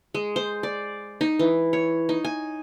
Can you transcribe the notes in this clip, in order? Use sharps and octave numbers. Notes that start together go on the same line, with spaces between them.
G#3
C5
D5
D#4
E3
C#5
D#4
G#5